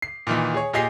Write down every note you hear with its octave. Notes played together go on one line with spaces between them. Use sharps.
C7
A#2 D#3 E3
G#4 C#5
A#2 G4 G#4 D#5 D#6 C7